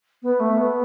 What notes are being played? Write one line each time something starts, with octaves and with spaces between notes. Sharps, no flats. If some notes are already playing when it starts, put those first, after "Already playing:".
B3
A3
B3